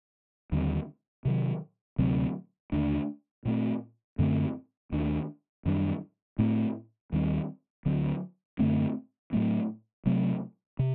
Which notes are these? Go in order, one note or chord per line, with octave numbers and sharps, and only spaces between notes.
D#2 D3 G3 C4
C3 D#3 F#3
D2 C3 F#3 C4
D#2 D3 A3 D4
A#2 A3 C4
F#2 D3 A3 C4
D#2 D#3 A3 D4
F#2 D#3 G3 D4
A2 A3 C4
D#2 D#3 G3 C4
D2 D3 F#3 C4
F#2 D3 A3 C4
A2 F#3 A3 C4
C3 F#3 A3 C4
C3